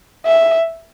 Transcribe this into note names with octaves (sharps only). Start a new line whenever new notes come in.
E5